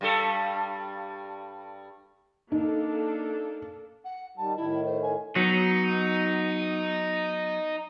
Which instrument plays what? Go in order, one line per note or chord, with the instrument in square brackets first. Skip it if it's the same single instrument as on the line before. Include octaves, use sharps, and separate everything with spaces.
[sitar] G2 G3 A4
[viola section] A#3 D4 A4 [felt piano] D#4
[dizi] F#5
[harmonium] D#3 G3 [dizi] A5
[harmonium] A2 D#3 [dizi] E4
[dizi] C5
G#5
[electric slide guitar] F#3 B3 [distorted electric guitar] D#4